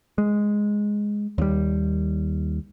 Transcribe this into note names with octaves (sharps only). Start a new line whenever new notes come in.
G#3
D#2 G3